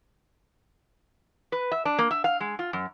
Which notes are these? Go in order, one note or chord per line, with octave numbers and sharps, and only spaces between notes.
B4
E5
D4
A#3
E5
F5
G#3
F4
F#2